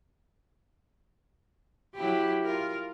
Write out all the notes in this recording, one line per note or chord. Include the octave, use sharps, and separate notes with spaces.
F#3 E4 G4
F4 A#4